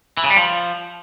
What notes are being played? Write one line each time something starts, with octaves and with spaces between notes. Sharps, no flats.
E3
C#3
G3
F3